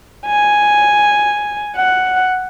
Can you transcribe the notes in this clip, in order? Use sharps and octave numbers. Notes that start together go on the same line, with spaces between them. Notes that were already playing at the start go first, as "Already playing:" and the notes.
G#5
F#5